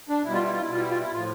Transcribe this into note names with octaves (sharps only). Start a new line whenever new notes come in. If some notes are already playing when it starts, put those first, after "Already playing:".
D4
B2 G3 E4
F4
E4
F4
E4
B2 G3 F4
E4
F4
E4
A2 F3 F4